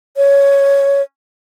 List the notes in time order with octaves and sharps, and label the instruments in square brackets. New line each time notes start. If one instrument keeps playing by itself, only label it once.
[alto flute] C#5